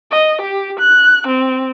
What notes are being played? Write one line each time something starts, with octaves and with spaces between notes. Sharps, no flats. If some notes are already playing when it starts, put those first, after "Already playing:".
D#5
G4
F#6
C4